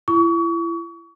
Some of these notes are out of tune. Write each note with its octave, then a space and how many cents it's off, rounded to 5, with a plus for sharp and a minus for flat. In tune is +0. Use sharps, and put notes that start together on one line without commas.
E4 +35 C#6 +35